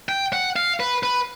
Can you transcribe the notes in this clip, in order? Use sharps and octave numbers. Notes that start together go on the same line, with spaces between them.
G5
F#5
F5
B4
B4